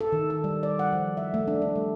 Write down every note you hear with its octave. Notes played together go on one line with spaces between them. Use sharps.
A4
D#3
A4
G3
D5
F#5
F3
E5
A3
D4
A3
G3